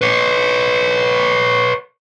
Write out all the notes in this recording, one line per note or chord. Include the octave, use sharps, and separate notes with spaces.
B4 C#5